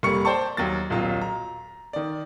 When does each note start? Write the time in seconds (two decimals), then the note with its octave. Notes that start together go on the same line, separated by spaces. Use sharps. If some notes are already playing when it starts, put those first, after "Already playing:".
0.03 F1 G3 A#3 C#6 C#7
0.25 C5 D5 G5 A5 C#6
0.57 D#2 F#3 A6
0.90 D#1 B1 F#3 F4
1.21 A#5
1.93 D#3 D5